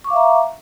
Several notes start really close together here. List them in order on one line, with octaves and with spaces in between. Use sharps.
C#6 D6 F5 E5 A#5